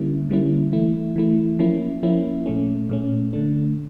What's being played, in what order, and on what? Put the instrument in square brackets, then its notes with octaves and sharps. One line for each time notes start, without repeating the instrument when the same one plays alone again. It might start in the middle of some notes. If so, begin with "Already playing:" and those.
Already playing: [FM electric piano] D3 G3 A#3 C#4 E4
D3 G3 A#3 C#4 E4
E3 A3 E4
E3 A3 E4
F3 A#3 C#4 E4
F3 A#3 C#4 E4
A#2 A3 C#4
A#2 A3 C#4
D3 A3 D4